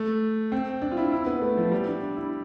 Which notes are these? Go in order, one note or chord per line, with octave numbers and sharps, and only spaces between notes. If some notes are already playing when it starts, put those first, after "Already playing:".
Already playing: A3
C4
D4
F4
E4
E4
B3
A3
F3
G3
D4
D4
E4